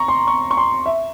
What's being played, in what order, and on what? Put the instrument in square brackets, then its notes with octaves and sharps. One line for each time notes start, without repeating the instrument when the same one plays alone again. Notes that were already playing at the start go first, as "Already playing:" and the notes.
Already playing: [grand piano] A#5 C#6
C6
C#6
C#6
C6
E5